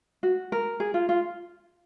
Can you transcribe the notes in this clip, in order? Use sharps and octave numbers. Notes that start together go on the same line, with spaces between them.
F#4
A#4
G#4
F4
F4